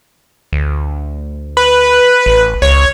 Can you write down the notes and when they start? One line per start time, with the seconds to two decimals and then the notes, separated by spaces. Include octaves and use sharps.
0.53 D2
1.57 B4
2.26 A1
2.62 C#2 C#5